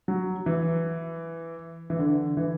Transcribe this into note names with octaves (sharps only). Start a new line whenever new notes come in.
F#3
E3
E3
D3
E3